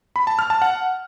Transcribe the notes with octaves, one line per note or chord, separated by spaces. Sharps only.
B5
A5
F6
A5
F#5